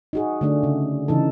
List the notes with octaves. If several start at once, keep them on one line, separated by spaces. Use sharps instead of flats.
D#4 F#4 G#4
D3 A3 D4
C#3
C#3 E3 D#4 A4